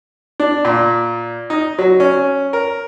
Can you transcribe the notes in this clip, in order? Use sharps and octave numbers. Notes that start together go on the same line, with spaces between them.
D4
A#2
D#4
F#3
C#4
A#4